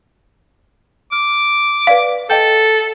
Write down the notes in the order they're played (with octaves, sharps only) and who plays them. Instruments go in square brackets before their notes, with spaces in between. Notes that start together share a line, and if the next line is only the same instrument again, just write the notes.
[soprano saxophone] D6 [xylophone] F6
[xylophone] B4 D5 F5
[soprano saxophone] A4 [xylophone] D#5 G5 G6